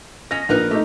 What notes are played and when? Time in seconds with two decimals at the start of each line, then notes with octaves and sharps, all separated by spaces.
0.31 C#4 D#5 A#6
0.49 A#1 D#4 A#4 B4
0.71 A3 D#4 G4